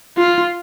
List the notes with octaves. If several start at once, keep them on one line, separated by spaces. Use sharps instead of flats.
F4